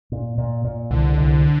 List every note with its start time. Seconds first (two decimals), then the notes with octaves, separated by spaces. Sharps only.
0.12 A#2
0.38 A#2
0.65 A#2
0.90 C2 D3
1.17 C2